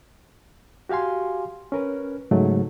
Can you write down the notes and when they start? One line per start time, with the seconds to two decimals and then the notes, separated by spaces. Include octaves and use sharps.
0.89 F#4 G4 F5 G#5 C6
1.72 C#4 A#4 B4
2.31 G#2 C#3 F#3 A3